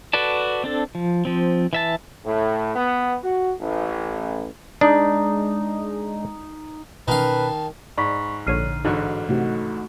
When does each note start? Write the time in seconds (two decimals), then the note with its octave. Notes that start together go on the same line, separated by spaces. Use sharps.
0.13 F#4 A4 B4 D5 A5
0.64 C4 D4 A4
0.95 F3
1.25 F3 C4
1.73 E3 E5 A5
2.25 A2
2.75 B3
3.23 F#4
3.59 A1
4.81 G#3 D4 D#4
7.08 B2 D#3 C#4 B4 F5 A5
7.98 G#2 D5 B5 C#6 B6
8.47 A#1 D3 C#5 F6 C7 D#7
8.85 A1 G#2 D3 D#4 F#4 C#6
9.29 C3 A3 D#4 F#4